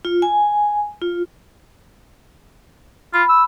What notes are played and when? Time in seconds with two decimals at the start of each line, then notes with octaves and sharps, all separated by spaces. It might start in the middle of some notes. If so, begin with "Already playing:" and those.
0.05 F4
0.22 G#5
1.02 F4
3.14 F4 B5
3.29 E6